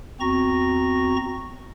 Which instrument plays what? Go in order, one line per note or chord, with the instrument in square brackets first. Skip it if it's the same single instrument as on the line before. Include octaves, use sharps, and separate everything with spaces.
[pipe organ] E2 C4 F#4 A#5 C#6 A#6